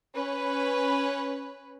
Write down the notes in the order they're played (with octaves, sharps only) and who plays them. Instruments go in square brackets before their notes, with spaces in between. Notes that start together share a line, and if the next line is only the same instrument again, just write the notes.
[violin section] C#4 B4